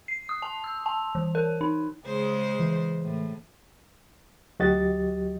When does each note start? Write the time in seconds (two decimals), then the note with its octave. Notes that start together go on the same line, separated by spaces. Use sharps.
0.08 C7
0.29 D#6
0.42 A5
0.64 E6
0.86 A5
1.15 E3
1.35 A#4
1.61 D#4
2.06 C#3 G#3 C5
2.59 E3
3.04 A2
4.59 D2 F#3 F#4 G4 D#5 A6